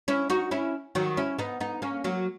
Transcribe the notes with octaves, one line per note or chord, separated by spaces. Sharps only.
C#4 E4
D#4 F#4
C#4 E4
D#3 F#3
C#4 E4
B3 D#4
B3 D#4
A#3 C#4
F#3 A#3